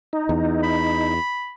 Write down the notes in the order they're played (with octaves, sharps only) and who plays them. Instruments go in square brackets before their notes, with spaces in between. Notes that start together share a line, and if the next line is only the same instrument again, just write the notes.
[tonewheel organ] D#4
[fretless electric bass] E2
[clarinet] B5